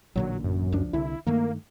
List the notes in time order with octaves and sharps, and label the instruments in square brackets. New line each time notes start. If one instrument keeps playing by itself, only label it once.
[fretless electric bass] A1 A#2 D3 [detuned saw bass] F#3
[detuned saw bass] F#2
[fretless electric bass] C#2 F3 D4
[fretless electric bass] C2 D3 [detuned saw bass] E4
[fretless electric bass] G2 D#3 A3 [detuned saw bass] A#3